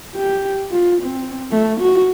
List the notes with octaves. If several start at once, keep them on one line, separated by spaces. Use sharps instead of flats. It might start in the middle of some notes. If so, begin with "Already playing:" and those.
G4
F4
C4
A3
F#4